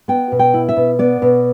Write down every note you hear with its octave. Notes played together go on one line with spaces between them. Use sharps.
B3 G5
B2
G5
E4
E5
B2
B3 D5
B2